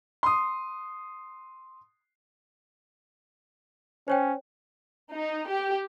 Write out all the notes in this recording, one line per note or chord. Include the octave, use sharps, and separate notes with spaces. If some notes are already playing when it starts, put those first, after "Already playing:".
C6 D#6
C#4 C5 C#5 G5
D#4
G4